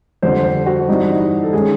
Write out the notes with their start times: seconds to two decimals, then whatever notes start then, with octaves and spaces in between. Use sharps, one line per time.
0.22 F2 D3 G3 C5
0.44 C5
0.66 F#4
0.88 G2 E3 G3 C4 D#4 E4
1.09 D#4
1.44 A4
1.53 D#3 G#3 C#4 G#4